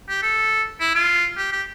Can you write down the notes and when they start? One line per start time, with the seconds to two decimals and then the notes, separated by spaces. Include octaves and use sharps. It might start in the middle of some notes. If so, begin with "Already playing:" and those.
0.09 G4
0.23 A4
0.80 E4
0.95 F4
1.37 G4
1.52 G4